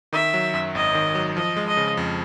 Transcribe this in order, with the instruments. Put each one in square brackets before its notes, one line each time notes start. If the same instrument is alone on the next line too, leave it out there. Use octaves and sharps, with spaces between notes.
[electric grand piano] D#3 [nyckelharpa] E5
[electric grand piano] F#3
F#2
[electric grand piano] G#1 [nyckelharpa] D#5
[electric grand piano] D#3
F#3
[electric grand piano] F3 [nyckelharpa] D#5
[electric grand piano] G#3
[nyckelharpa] D#5
[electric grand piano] C#3
F2